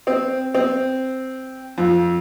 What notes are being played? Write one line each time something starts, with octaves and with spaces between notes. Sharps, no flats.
C4
C4
F2